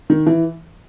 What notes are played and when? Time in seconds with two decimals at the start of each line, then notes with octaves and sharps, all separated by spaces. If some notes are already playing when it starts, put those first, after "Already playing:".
0.10 D#3
0.26 E3